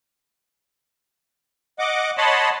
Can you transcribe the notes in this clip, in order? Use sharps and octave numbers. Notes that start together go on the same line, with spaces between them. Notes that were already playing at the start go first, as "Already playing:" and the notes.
D#5 F#5 D6
C#5 D#5 F#5 A5 B5 C6